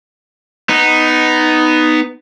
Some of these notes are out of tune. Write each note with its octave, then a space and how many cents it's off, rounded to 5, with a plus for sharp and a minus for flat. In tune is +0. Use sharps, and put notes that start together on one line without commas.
B3 +10 D#4 +0